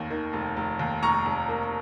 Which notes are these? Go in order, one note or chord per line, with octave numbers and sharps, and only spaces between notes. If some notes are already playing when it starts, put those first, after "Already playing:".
Already playing: F1 D#2 D#3 A#3
D#3
F1
F1
D#2
F1 A#5 C#6
F1
A#3